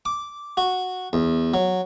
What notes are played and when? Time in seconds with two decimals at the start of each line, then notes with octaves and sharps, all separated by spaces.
0.05 D6
0.57 F#4
1.13 E2
1.54 F#3